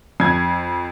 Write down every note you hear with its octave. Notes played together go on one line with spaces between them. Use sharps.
F2 G#6